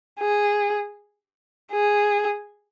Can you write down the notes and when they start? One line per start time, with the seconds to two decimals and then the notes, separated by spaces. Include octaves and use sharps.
0.20 G#4
1.72 G#4